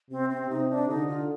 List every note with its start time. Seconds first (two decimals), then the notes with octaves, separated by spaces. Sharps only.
0.10 C3 C4
0.30 C4
0.49 C3 D#4
0.70 D4
0.89 D3 D#4
1.08 F4